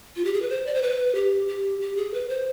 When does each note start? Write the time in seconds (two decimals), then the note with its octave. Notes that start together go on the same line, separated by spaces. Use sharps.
0.16 F4
0.25 G4
0.33 G#4
0.42 B4
0.50 C5
0.66 D5
0.75 C5
0.82 B4
1.15 G4
1.48 G4
1.81 G4
1.97 G#4
2.14 B4
2.29 C5